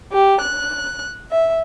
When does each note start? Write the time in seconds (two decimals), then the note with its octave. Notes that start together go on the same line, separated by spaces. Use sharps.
0.11 G4
0.41 F#6
1.30 E5